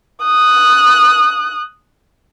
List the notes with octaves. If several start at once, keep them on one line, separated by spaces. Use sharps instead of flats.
D#6 F#6